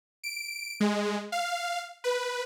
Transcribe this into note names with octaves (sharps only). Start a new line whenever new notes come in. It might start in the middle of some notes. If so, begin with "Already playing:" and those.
D7
G#3
F5
B4